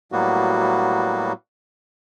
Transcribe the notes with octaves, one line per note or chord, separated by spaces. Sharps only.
A2 F#3 G3 A#3 B3 F#4